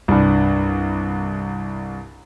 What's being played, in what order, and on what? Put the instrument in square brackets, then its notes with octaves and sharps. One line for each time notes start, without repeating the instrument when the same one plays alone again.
[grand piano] C2 G2